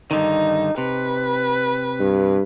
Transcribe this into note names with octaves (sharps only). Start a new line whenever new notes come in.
G2 D3 D#3 D#4
C3 B4
G2